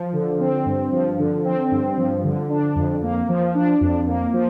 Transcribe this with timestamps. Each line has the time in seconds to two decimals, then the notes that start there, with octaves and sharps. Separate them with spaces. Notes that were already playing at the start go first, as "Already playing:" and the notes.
Already playing: F3
0.13 D3
0.40 C4
0.66 G2
0.92 F3
1.19 D3
1.45 C4
1.71 G2
1.98 F3
2.24 D3
2.50 D4
2.76 F2
3.02 A#3
3.29 F3
3.55 D4
3.81 F2
4.07 A#3
4.33 F3